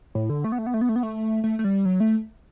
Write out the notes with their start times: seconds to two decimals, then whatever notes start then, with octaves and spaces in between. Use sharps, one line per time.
0.15 A2
0.30 D3
0.44 A3
0.52 B3
0.58 A3
0.67 B3
0.74 A3
0.81 B3
0.89 A3
0.96 B3
1.03 A3
1.44 A3
1.59 A3
1.64 G3
1.85 F#3
2.00 A3